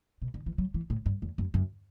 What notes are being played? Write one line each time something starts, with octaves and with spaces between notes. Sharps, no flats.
B2
D3
E3
F#3
E3
A2
G2
E2
F#2
F#2